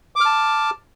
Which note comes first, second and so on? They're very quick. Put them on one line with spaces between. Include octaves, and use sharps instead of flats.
D6 F6 A5